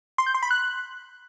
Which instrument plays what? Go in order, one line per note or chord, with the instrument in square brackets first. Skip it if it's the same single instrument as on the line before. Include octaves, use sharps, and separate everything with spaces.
[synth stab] C6
G6
C6
B5
F#6